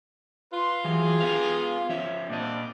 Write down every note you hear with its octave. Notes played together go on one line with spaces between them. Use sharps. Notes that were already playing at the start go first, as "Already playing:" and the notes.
F4 B4 C6
E3 F#3 G4 G#4
B3 B4 F5
F3 C#4 E5
A#2 G3 C4 D4 D5 D#5